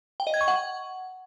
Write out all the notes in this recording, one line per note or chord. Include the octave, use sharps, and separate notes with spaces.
G5
D#5
G#6
C#6
F#5